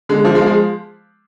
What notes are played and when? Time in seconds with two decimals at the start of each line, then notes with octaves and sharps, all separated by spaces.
0.09 D3 G#3
0.24 F3
0.35 G#3
0.41 F3
0.46 G#3